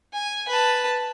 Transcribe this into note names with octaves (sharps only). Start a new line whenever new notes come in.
G#5
B4 A5